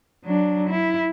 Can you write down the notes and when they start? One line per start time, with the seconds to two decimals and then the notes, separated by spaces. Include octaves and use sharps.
0.25 F#3 D4
0.70 E4